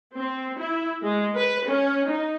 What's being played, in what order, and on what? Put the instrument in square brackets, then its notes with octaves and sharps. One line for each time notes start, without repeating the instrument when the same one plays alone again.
[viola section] C4
E4
G#3
B4
C#4
D#4